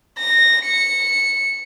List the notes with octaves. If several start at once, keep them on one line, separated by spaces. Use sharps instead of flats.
A#6
C#7